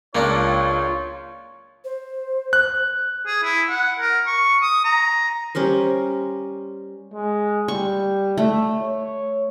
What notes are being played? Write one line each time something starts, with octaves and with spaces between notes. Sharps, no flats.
C#2 A#3 D4 F4 C#5
C5
F#6
G#4
E4
F#5
A#4
C#6
D#6
A#5
G3 C#4 A#4 C5
G#3
G3 C#6
A3
C#5